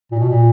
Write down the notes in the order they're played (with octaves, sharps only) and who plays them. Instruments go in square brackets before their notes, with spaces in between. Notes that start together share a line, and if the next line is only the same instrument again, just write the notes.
[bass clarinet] A#2
B2
A#2